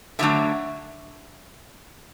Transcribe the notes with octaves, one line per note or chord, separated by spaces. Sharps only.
D3 F#3 A3 D4 E5